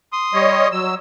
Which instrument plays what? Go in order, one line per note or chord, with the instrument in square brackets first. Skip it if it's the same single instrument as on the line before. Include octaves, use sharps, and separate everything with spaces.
[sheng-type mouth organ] C6 D#6
[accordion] G3 C#5 D#5
F#3 E6